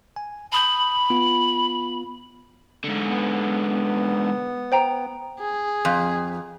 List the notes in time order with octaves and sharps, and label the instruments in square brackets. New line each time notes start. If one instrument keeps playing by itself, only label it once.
[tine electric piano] G#5
[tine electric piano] A5 D#6 G6 [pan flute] B5
[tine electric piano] B3 F4
[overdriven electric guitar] G#2 D3
[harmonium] B3
[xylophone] C5 G5 A#5
[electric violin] G#4
[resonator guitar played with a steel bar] F2